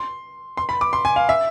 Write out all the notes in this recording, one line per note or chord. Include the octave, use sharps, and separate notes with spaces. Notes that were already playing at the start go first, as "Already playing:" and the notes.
Already playing: C6
C6
B5
D6
C6
G#5
F5
E5